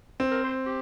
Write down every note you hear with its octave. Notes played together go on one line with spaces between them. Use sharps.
C4
A#4
C5
G4